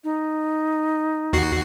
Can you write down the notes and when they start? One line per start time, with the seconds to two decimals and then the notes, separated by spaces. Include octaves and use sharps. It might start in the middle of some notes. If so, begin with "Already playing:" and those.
0.04 D#4
1.33 D#2 F#4 C7